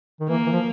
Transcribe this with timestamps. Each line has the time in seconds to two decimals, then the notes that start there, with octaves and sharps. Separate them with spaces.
0.20 D#3
0.28 E3 A#3
0.46 E3
0.52 F3